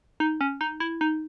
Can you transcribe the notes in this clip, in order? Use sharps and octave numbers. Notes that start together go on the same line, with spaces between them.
D#4
C#4
D#4
E4
D#4